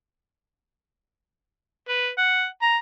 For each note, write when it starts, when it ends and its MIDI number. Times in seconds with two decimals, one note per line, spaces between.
1.88 2.10 71
2.18 2.46 78
2.62 2.77 82